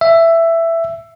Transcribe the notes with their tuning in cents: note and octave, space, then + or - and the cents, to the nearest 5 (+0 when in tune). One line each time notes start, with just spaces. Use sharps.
E5 +10